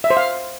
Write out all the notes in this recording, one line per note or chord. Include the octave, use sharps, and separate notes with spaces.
E5
C5
F5